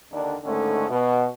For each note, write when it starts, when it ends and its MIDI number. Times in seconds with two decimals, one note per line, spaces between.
0.13 0.35 39
0.13 0.35 50
0.13 0.35 62
0.43 0.87 39
0.43 0.87 44
0.43 0.87 50
0.43 0.87 57
0.43 0.87 61
0.88 1.25 47